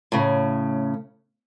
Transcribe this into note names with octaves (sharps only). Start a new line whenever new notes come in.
A2 C#3